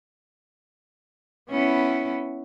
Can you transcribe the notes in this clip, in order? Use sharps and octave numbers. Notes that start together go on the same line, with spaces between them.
B3 C#4 E4